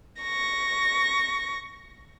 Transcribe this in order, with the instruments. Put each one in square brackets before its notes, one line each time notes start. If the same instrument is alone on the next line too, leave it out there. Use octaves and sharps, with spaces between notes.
[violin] C#6 A#6